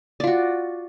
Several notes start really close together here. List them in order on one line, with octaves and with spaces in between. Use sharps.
D5 F4 F#4